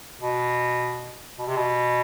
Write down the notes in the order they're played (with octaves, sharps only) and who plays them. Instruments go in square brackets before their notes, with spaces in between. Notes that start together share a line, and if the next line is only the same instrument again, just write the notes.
[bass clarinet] B2
B2
C3
B2